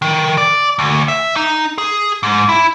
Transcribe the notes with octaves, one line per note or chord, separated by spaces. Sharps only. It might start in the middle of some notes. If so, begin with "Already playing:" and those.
D#3
D5
D2
E5
D#4
G#4
G#2
E4